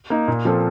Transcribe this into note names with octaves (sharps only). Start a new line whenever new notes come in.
A#3 D#4
A#2
F3 C4 F4 A4